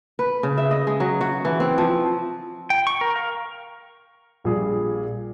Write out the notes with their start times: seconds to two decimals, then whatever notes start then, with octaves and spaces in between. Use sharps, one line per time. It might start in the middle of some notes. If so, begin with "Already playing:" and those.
0.19 B4
0.43 C#3
0.58 E5
0.71 D#5
0.87 G#3
1.00 F#3
1.21 F#4
1.45 E3
1.60 C4
1.78 F3
2.70 G5
2.87 C#6
3.01 A#4
3.16 F5
4.44 A#1 A#2 G3 G#4